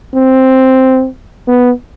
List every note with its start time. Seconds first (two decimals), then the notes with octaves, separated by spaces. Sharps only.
0.14 C4
1.48 B3